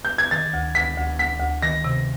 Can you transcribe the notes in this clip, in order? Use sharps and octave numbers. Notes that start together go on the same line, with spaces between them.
G6
G#6
D#3 A6
D2
D2 B6
D2
D2 B6
D2
D#3 A#6
C3